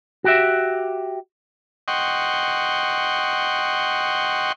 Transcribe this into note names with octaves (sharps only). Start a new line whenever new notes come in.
F#4 G4 E5
D#5 F#5 G5 C6 C#6